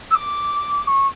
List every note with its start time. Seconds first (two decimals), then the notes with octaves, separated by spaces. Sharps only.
0.11 E6
0.15 D6
0.87 C#6